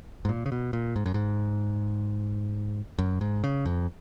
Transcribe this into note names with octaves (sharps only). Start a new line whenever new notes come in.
G#2
A#2
C#3
B2
A#2
G#2
F#2
G#2
F#2
G#2
C#3
F2